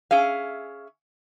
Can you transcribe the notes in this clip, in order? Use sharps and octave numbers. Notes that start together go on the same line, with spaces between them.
C#4 G#4 E5 F5